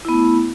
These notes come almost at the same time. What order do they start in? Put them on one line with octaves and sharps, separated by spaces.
E4 B3 A3